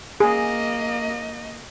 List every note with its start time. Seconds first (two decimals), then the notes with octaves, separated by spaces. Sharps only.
0.20 A#3 G#4 D#5